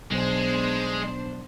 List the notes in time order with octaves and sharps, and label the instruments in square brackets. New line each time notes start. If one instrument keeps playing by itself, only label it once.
[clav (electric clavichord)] B1 [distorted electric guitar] G#3 [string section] B3 D4 C5